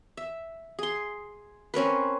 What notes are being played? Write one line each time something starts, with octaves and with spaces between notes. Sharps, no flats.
E5
G#4 C6
C4 C#4 A#4 B4